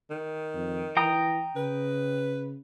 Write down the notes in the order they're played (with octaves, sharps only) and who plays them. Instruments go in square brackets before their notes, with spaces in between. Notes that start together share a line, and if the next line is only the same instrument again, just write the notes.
[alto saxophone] D#3
[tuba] F2
[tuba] E3 [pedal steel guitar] G5 A#5 D#6
[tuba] C#3 [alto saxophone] B4